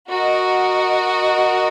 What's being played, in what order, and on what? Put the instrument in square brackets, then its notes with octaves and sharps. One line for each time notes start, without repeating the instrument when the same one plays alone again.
[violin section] F#4 A#4 D#5